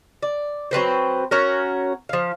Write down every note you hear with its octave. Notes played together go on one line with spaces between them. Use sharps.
D5
F#3 C4 B4 C5
C#4 F#4 A#4
F3 F5